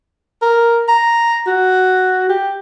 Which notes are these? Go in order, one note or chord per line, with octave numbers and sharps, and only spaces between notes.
A#4
A#5
F#4
G4